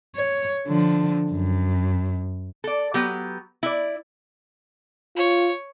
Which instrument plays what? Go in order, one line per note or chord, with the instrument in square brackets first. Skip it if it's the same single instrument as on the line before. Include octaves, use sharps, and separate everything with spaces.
[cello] C#5
D3 F3
F#2
[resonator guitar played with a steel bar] A4 D5
F#3 B3 G4
E4 D5
[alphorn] F4 [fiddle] C#5